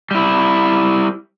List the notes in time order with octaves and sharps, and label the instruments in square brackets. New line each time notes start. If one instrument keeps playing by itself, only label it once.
[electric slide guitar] G3 E4